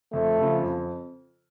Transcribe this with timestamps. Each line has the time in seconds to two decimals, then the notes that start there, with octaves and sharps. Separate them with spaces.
0.12 F2 A3
0.39 C#3 F3
0.62 F2